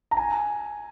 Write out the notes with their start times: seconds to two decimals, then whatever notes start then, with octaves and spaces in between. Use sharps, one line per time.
0.11 A#5
0.17 G#5